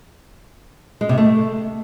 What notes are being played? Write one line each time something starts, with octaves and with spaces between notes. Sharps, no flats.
G#3
C3
A3